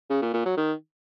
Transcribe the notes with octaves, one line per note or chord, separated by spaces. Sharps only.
C#3
A#2
A#2
F#3
D#3